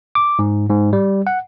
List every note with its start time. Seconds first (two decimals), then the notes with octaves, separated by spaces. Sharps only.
0.15 D6
0.39 G#2
0.70 G#2
0.93 G3
1.27 F#5